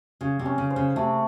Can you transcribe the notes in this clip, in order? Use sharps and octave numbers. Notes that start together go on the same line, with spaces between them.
C#3 G#4
C3
C#4
C#3
C5
C#3
C3 A3